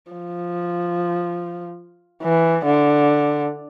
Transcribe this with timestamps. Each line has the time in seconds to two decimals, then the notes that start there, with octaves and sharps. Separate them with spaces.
0.12 F3
2.23 E3
2.65 D3